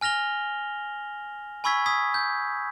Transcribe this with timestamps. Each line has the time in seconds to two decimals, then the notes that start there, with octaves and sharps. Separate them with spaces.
0.01 G#5 F6 A#6 F7 G7
1.64 G#5 B5 C#6 E6 G#6 B6
1.86 D#6 G#6 B6
2.14 G6